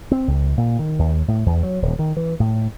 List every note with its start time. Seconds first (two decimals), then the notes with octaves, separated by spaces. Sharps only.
0.11 C4
0.28 C#2
0.58 A#2
0.79 D#3
0.99 D#2
1.28 A2
1.46 E2
1.63 F#3
1.82 D#1
1.99 D#3
2.17 E3
2.40 A2